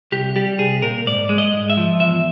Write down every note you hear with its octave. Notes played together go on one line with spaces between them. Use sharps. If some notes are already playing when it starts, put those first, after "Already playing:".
C2 G4
G3 G4
C2 G#4
A#2 A#4
G#2 D5
G#3
D#5
G#2
E5
F3
E2 E5